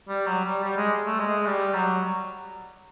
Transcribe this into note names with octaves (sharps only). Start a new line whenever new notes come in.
G3
F#3
G3
G3
G#3
A3
G#3
G3
F#3